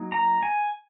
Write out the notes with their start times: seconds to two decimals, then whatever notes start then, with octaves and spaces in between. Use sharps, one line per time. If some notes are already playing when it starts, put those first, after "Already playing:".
Already playing: F#3 A#3 D#4
0.12 A#5
0.43 G#5